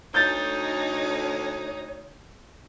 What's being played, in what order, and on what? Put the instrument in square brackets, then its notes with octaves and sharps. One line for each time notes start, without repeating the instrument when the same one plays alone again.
[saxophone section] D2 [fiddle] D#4 [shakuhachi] C#5 [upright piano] G6 A6